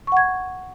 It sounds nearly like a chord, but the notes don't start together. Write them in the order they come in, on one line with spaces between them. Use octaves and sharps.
C#6 F#5 G#6